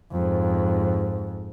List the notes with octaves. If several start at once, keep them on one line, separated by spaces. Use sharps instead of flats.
F2 G#2